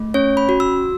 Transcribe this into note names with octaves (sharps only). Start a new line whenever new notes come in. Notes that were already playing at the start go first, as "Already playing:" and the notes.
Already playing: A3
C#4 C#5
B5
F#4
E6